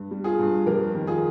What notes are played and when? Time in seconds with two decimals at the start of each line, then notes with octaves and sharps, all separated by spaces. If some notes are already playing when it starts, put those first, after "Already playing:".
Already playing: G2
0.11 G3
0.24 F4 G#4
0.39 G2
0.66 F2 G4 A#4
0.94 D#3
1.07 F4 G#4